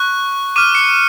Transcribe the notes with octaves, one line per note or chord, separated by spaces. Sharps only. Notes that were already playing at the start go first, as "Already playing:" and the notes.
Already playing: C#6 F#6
D6 F6 D#7
C#7